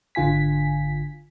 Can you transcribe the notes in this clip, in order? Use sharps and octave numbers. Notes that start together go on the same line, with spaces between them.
G#1 D3 F4 G#5 B6